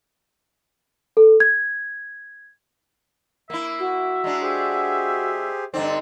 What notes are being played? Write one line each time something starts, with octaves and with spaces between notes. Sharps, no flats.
A4
G#6
A#3 E4 E5
F#4
G#3 D4 A#5 C6
G4 G#4 C5
G2 D3 C4 D#4 D5